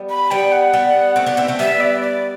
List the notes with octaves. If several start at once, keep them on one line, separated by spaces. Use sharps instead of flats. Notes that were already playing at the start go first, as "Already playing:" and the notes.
Already playing: G3 B3
B5
G3 B3 G5
F#5
G3 B3
A3 C4
B3 D4
C4 E4
A3 C4
G3 B3 E5
D5
D5